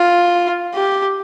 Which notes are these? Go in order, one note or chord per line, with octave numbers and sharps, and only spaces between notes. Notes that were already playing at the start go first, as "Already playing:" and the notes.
Already playing: F4
G4